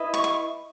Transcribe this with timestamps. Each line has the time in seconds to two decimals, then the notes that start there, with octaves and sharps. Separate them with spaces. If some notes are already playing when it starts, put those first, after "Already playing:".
Already playing: E4 B4 D#5
0.14 C#6
0.24 C#6